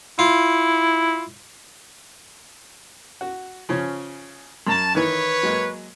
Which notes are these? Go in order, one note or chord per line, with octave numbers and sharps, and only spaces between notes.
E4 F4
F#4
C#3 F3 C#4
F#2 A5 A#5
D#3 E3 B4 C#5
F#3 G#3 A#3